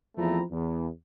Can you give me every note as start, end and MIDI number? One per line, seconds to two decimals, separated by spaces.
0.17 0.40 40
0.17 0.40 53
0.17 0.40 57
0.17 0.40 60
0.17 0.40 64
0.17 0.40 82
0.50 0.87 40